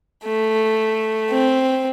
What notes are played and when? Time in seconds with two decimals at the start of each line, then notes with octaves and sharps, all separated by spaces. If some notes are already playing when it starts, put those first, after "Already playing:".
0.24 A3
1.30 C4